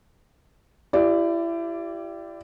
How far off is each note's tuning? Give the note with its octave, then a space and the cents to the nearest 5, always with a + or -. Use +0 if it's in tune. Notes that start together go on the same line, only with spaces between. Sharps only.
E4 +30 G4 -15 D5 +0